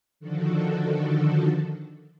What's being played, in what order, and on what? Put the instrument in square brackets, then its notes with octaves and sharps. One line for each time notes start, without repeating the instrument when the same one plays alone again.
[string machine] D3 D#3 F3 D4 F#4 A4